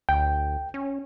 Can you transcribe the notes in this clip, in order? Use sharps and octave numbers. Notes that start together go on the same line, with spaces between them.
D2 G5
C#4